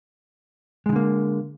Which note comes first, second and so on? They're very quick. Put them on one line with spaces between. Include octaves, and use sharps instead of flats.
G#3 D#3 D3 A#3